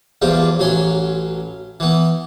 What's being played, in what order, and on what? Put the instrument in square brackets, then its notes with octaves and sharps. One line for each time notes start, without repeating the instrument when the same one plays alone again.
[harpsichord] E2 G2 F3 G4
A1 F#3 C#4 C6
E3 B3